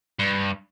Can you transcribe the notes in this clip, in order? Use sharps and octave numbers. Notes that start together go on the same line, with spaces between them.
G2